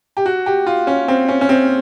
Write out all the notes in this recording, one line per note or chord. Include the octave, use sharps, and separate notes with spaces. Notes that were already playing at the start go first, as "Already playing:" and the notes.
G4
F#4
G4
F4
C#4
C4
C#4
C#4
C4